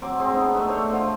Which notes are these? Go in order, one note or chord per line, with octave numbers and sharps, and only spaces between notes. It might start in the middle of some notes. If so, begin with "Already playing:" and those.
F#3 C4 G#5 D6
G#3 C4 G#4
B3 D4 D#4
A3 A4 B4 E5
D4 C5 C#5
D3 F3 C5